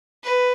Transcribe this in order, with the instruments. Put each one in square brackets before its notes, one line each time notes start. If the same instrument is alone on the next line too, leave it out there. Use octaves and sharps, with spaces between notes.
[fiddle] B4